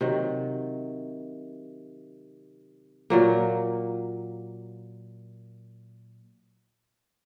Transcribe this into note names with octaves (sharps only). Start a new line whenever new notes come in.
C3 D#3 F#3
A#2 F#3 A#3